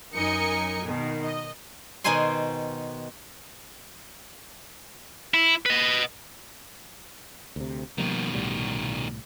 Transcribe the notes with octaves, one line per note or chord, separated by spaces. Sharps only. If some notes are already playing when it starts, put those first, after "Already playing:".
F#2 D#4 A#4 D#5 G#5 C#7
B2 D#3
D#5
B2 D#3 D#4 C5 G#5 C6
E4
B4 D#5
D2 C3
B2 D#3 F3 G3 A#3
C2 A2 G3